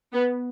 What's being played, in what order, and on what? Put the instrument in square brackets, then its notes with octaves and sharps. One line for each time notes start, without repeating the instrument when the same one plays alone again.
[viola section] B3